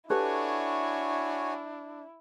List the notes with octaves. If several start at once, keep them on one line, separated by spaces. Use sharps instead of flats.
D4 E4 F#4 G4 A4 B4 C#5 G#5